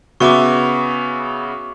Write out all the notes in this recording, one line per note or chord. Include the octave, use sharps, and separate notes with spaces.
C#3 B3 F#4 E5 C#6 D6